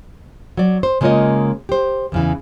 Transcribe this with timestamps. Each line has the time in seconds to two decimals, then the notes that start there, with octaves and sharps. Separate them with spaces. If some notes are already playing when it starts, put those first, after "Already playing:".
0.57 F#3 D5
0.83 C5
1.01 C#3 G#3 A#3 F4 C#5 D#5
1.69 G4 C5
2.12 E2 C#3 E3